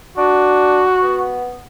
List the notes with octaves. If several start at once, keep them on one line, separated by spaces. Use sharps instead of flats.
D4 F#4
B3